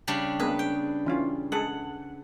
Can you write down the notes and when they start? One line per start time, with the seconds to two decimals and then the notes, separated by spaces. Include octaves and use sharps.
0.08 C#3 G3 D4
0.40 G#3 A#3 B3 B4
0.59 G5
1.06 E3 C#4 F4
1.52 G#3 G#4 A4 F#5